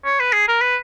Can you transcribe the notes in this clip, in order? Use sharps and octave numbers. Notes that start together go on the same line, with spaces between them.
C#5
B4
G#4
A#4
B4